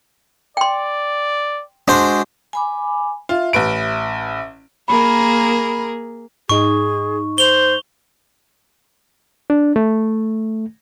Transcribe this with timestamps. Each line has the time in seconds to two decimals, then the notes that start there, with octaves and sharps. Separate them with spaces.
0.57 D5 G5 C6
1.88 G#3 D4 F#4 G#4 C5
2.53 G#5 B5 D6
3.29 F4 E5
3.53 A1 B4 D7
4.88 A#3 G#4 A#4 B5
6.49 G#2 D#4 G#4 C#6
7.38 C5 F7 G7
9.50 D4
9.76 A3